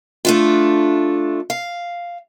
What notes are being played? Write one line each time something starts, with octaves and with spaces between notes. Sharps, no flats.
A3 D4 F4
F5